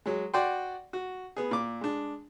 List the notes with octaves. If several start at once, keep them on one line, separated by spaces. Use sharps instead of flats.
F#3 G#3
F#4 D5 F#5 G5 C6
F#4
B3 G#4
A#2 D6
G#3 D4